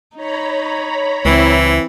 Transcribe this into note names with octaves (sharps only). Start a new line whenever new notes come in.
D#4 C#5 A#5 B5
C#2 E3 C4 E4